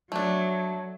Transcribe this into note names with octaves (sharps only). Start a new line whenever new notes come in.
F#3 A3 D4